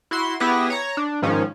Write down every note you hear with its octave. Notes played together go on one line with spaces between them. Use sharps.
E4 F#4 C6
B3 E4 G4 G#4 B4 A#6
C#5 A#5
D4
G#2 D#3 F3 C#4